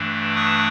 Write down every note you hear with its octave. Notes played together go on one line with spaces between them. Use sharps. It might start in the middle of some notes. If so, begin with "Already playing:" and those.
Already playing: G2 E3 A3 D4
C#6 D#6